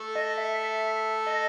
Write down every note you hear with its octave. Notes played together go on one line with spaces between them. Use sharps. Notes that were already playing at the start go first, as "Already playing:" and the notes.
Already playing: A3 A4
D#5
E5
D#5